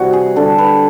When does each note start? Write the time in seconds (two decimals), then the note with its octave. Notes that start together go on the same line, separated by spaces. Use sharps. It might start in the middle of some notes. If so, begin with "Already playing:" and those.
Already playing: C3 E3 G3 F#4
0.13 G#4
0.36 D3 G3 A4
0.58 B4